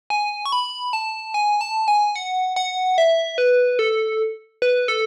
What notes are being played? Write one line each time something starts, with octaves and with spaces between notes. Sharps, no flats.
G#5
C#6
B5
A5
G#5
A5
G#5
F#5
F#5
E5
B4
A4
B4
A4